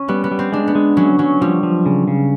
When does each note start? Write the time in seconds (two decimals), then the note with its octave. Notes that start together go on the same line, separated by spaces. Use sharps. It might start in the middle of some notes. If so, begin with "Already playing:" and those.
Already playing: C#4
0.08 G3 B3
0.24 B3
0.31 G3
0.39 C4
0.52 G#3 D4
0.67 B3
0.75 G#3
0.97 F#3 C#4
1.19 F#3 C#4
1.41 F3 G3
1.63 F3
1.86 C#3
2.08 C#3